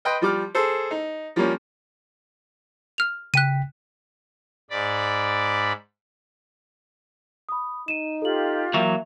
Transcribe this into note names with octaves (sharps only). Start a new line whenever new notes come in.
B4 D#5 G5 C6
F3 G3 D6 F6
G#4 A4 C5
D#4
F3 G3 A#3 C#4
F6 F7
C#3 G5 F#6 B6 D#7
G#2 D5 B5
B5 D#6
D#4 D#7 E7
F4 G4 A4 F#7
E3 F#3 A#3 E5